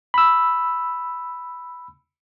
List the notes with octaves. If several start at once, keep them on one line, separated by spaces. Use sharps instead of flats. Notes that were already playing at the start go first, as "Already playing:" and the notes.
B5 E6